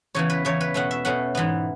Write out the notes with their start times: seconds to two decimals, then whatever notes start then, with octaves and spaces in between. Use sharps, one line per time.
0.15 E2 C#3 E3 C#5
0.30 B4
0.45 E2 C#3 E3 C#5
0.61 B4
0.74 B2 A3 C#4 F#5
0.91 E5
1.05 B2 A3 C#4 F#5
1.35 G#2 E3 B3